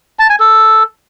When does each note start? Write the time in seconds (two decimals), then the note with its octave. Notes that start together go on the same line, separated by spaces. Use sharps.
0.19 A5
0.29 G#5
0.40 A4